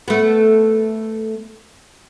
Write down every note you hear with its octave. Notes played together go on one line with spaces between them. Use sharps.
A3 B3